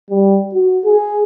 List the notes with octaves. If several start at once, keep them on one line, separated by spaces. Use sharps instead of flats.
G3
F#4
G#4